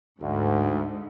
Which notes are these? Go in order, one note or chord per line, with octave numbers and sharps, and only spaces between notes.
D2 G#2